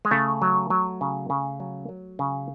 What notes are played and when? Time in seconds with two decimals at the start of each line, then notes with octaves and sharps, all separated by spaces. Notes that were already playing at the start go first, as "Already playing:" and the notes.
0.05 G#3
0.11 C#3 A3
0.42 F#3
0.70 F#3
1.01 C#3
1.30 C#3
1.60 F#3
1.89 F#3
2.19 C#3